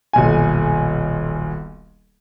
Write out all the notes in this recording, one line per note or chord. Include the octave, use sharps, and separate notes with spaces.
D#1 B1 G#5